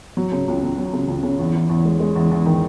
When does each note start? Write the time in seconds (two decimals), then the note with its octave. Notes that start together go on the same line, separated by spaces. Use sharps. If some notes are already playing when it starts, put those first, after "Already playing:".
0.17 F#3
0.32 C#3
0.48 C#2
0.63 C#2
0.78 F#3
0.93 C#3
1.08 C#2
1.23 C#3
1.39 E2
1.54 E2
1.69 E2
1.85 G#3
2.00 G#3
2.15 E2
2.31 E2
2.46 D#3